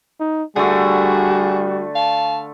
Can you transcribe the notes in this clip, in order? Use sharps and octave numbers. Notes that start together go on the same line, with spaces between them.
D#4
D3 G3 A3 F#4 G#4
F5 A5